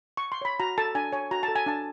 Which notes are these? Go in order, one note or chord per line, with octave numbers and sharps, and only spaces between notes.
C#6
C6
C#5 B5
F#4 A#5
A4 A5
D4 G#5
C#5 G#5
F#4 A#5
A5
A4
G#5
D4 A5